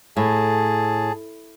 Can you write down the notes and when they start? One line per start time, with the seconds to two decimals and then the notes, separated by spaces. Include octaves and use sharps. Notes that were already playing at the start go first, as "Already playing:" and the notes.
0.17 A2 G#4 A5